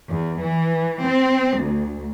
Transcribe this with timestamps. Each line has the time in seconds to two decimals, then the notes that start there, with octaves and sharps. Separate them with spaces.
0.10 E2
0.43 E3
1.03 C4
1.60 D2